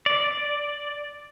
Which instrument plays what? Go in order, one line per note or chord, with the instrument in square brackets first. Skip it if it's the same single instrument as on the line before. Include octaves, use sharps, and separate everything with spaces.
[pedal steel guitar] D5